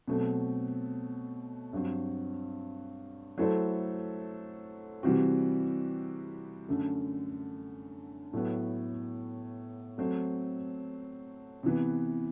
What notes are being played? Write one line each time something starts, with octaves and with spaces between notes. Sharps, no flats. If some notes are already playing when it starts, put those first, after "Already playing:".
B2 F#3 A3 C4
G2 F#3 C4
F#3 A3 E4 A4 C5
C3 E3 G3 C4 F#4
F#2 D3 A3
A2 F#3 B3
F#3 A3 C4
C3 E3 B3